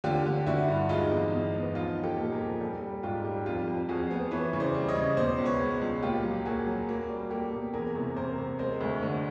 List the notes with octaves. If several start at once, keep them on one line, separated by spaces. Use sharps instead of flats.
D3 F4 G4
D3
D3 E4 F#4
G2
G#3 D#4 F4
E2
E2
B3
F3 D#4 F4
F3
G4 A4
A#2
G#4 A#4
F3
G3 G4 A4
G3
G#2 F4 G4
G3
F2 F4 G4
F2
F2 F#4 G#4
B3
E3 B4 C#5
C#3
C5 D5
G3
C#5 D#5
C#3
B2 C5 D5
C#2
B4 C#5
G#3
C#2
A#2 F4 G4
F#3
A#3 F#4 G#4
F#3
A#3
G3
A#3 G4 A4
B2
E2 G#4 A#4
C3
C3 A#4 C5
C3
G#3 A#4 C5
D2
D3